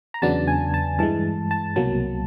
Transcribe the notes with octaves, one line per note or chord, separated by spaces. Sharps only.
A#5
E2 C#3 F#3 B3 D4 A5
G#5
A5
G2 E3 G#3 A5
A5
C2 B2 F#3 A#3 A5